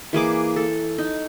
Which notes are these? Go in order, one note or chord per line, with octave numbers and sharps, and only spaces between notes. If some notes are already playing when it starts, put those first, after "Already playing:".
E3 A#3 G#4 D6
A4
D#4